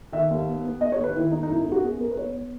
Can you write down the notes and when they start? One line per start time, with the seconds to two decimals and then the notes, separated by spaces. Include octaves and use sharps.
0.12 D#3 E5
0.31 D#2
0.47 B3
0.64 B3
0.81 B3 D#5
0.92 C#5
0.98 D#2
1.04 B4
1.15 D#3 E4
1.31 B3 D#4
1.43 D#4
1.49 F#2 E4
1.60 D#4
1.66 F#2
1.72 F#4
1.83 B3 G#4
2.00 B3 A#4
2.11 B4
2.17 B3 C#5
2.34 B3